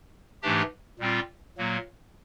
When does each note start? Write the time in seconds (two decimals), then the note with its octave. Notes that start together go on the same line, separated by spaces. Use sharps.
0.42 G#2 E3 A3 D4 G4
0.99 A#2 G3 C4 F4
1.58 A#2 F#3 A#3